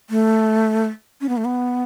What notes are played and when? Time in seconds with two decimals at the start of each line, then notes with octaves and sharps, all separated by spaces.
0.10 A3
1.21 C#4
1.29 B3
1.37 A3
1.45 B3